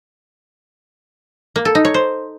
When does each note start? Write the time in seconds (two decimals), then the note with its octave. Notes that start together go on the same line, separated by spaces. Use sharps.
1.56 A#3
1.65 A4
1.75 D#4
1.85 C#5
1.94 C5